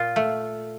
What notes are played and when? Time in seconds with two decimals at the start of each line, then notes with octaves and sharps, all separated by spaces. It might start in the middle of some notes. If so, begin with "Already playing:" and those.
Already playing: A#2 F4
0.16 A3